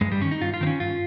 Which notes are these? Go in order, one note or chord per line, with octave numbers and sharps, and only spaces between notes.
G2 G#3
G3
D#3 C#4
D#4
G2 F4
F4
D#3 C4
C#4
G2 F4